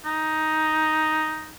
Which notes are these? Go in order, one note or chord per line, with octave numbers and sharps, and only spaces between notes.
D#4